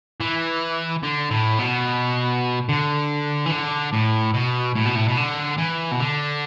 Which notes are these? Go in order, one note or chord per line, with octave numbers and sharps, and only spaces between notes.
E3
D3
A2
B2
D3
E3
D3
A2
B2
A2
B2
A2
B2
D3
E3
B2
D3